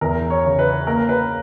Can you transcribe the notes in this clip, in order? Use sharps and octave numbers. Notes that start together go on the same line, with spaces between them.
E2 A#4
C#5
C#3
B4
A#3 A#4
B4